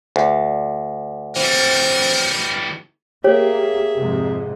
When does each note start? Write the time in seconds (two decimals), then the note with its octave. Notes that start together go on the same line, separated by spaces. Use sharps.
0.16 D2
1.36 E3 G3 C4 A#4
3.24 A#3 G4 G#4 C#5 E5
3.97 F2 G#2 C3